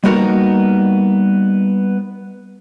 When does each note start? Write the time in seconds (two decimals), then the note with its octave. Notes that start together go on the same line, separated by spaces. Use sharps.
0.04 G3 A#3 B3 D#4 F#4 A#4